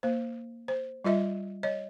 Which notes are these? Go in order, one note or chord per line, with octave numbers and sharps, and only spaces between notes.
A#3 C5
C5
G3 F4 D#5 E5
C#5 D#5